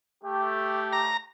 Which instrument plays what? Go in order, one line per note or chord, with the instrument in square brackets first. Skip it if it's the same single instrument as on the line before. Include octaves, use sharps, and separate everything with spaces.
[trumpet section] A3 G4
[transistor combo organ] A#5